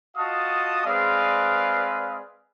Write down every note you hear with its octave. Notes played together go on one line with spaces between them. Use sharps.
F4 F#4 D#5 F5 A5 D#6
G#3 C4 G#4 B4 D5 F5